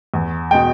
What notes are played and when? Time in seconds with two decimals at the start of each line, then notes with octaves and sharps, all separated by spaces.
0.14 E2
0.51 B2 G#3 G5